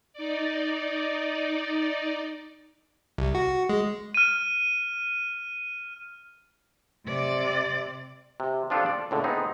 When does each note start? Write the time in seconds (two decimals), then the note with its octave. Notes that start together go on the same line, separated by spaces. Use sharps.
0.13 D#4 D5
3.18 C2
3.35 F#4
3.70 G#3
4.14 F6 D#7
7.07 C3 D5
8.40 C3
8.70 F3 D4 F4 G4 A4
8.86 D5
9.11 C#2 A2 D3
9.24 B3 C4 D#4 G#4